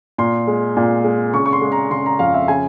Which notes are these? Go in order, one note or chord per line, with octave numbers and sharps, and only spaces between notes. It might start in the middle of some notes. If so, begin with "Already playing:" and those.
A#2 C6
G#3
A#2
G#3
C#3 C#6
C#6
C6
G#3
A#5
C#3 C6
A#5
F2 F5
E5
C#3 G#5